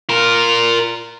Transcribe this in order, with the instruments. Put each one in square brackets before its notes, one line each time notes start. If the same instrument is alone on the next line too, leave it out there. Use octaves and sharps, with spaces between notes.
[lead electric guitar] F4 A#4